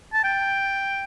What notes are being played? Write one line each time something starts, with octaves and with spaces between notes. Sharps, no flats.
A5
G5